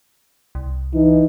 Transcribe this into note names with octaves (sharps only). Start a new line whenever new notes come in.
C2
E3 D#4